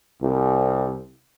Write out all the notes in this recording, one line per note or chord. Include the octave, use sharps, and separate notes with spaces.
C2